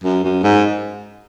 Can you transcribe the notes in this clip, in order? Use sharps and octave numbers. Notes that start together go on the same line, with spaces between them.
F#2
F#2
G#2